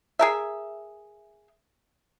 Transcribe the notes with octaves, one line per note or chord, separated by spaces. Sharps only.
G#4 A#4 E5